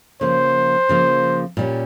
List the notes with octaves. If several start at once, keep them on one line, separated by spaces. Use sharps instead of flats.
C#3 F3 A#3 C5
C#3 F3 A#3
A#2 G3 C#4